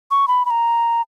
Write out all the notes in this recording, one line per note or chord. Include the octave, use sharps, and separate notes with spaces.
C#6
B5
B5
A#5